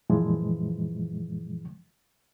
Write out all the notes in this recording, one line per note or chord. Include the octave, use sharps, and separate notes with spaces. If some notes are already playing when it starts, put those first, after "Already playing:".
F#2 A#2 E3 F3 G#3